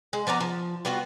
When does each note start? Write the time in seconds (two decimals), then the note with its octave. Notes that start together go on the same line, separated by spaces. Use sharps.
0.13 G#3
0.27 F3 B3 D5 A#5
0.40 F3
0.85 G3 B3 F4 F#4